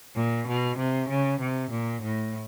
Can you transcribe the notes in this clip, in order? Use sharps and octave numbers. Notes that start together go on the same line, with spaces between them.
A#2
B2
C3
C#3
C3
A#2
A2